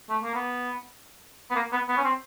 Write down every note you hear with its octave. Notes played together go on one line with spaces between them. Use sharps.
A3
A#3
B3
B3
A#3
B3
B3
C#4
C4